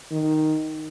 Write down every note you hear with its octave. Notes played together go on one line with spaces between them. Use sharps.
D#3